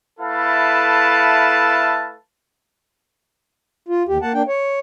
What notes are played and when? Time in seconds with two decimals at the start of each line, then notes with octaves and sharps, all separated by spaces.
0.19 A3 E4 A4 B4 F5 A5
3.88 F4
4.09 D#2 G4
4.22 A#3 F#5 A5
4.34 A#3 D4 G5
4.48 C#5